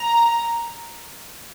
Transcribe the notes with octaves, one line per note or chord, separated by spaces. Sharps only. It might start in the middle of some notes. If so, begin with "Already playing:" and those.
Already playing: A#5